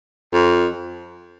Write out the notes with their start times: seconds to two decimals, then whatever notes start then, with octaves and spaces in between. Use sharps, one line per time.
0.33 F2